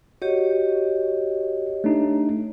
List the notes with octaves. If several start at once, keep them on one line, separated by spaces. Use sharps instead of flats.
F#4 G4 C#5 D#5
A3 D4 D#4